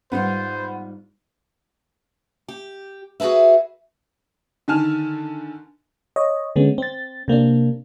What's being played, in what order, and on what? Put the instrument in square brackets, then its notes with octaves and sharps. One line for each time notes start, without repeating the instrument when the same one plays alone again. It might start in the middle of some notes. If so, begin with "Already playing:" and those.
[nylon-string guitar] G#2 G3 F4 [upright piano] B3 [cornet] C5
[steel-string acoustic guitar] G4
F#4 G#4 A#4 B4 E5
[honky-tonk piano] D3 D#3 G#5 A5 F6
[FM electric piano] C#5 D#5
D3 G#3 B3 C#4
C4 A6
C3 A#3 C4 D4